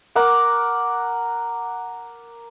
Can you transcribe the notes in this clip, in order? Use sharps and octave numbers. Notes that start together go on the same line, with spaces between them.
A#4 F#5 A#5 D6